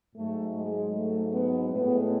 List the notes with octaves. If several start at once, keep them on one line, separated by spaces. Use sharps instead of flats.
G#2 F#3 A3
G#3
A3
B3
A2 G#3 B3